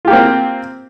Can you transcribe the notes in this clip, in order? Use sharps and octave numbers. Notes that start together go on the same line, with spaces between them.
A#3 C4 F4 G4